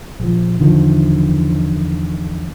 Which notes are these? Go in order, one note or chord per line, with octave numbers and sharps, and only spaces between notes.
A#1 F3
E2 D3 D#3 F3